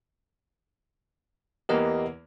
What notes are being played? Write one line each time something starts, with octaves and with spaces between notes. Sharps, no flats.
E2 A#3 B3 G4 A#4 D#5